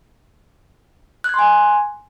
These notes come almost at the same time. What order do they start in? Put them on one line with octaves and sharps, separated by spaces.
F#6 G#6 C6 G#5